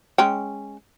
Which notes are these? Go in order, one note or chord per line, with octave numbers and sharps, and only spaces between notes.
G#3 C#4 G5